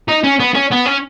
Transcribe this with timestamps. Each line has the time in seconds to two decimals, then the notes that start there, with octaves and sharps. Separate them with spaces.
0.08 D#4
0.24 C#4
0.40 B3
0.54 C#4
0.71 B3
0.86 C#4